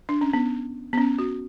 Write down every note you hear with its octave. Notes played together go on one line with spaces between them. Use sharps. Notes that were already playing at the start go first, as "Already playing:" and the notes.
D4
C#4
B3
B3
C#4
F#4